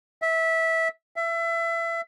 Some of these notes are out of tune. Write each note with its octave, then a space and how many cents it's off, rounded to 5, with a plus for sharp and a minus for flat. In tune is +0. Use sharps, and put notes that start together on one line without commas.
E5 -15
E5 +25